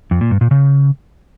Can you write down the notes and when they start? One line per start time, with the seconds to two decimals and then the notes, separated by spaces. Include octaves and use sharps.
0.11 F2
0.21 A#2
0.31 G2
0.41 A#2
0.51 C#3